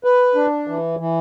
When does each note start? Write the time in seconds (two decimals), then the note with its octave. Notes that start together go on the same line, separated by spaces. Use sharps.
0.04 B4
0.35 D4
0.68 E3
1.00 E3